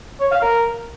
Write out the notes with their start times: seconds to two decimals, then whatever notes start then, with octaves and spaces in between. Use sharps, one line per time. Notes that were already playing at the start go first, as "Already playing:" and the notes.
0.20 C#5
0.31 F5
0.42 A#4